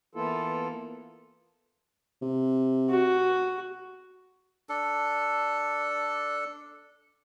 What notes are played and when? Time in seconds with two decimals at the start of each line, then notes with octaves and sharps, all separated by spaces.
0.15 E3 A#3 B3 E4 F4 A4
2.22 C3
2.90 F#4
4.69 D4 A4